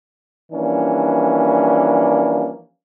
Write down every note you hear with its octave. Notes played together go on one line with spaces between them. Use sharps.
E3 F3 G3 A#3 C#4 D4